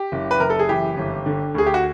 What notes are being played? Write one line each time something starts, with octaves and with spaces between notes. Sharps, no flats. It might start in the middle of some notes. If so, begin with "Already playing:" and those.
Already playing: G4
F#1
B4
F#1 A#4
A4
G#4
E3 G4
G1
D3
D2 G#4
G4
F#4